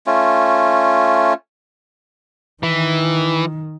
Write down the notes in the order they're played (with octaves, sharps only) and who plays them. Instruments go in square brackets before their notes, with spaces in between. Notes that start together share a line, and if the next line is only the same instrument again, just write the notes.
[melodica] A3 C#4 F4
[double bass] D#3 [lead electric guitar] E3